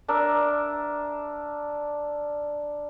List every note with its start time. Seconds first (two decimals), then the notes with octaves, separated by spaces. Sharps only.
0.08 D4 A#4 E5